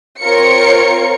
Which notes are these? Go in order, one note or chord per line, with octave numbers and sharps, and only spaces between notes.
C4 F4 A#4 C#5 C#7